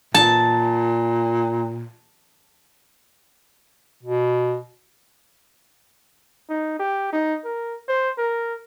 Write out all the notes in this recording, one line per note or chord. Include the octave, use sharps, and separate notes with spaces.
A#2 A5
B2
D#4
G4
D#4
A#4
C5
A#4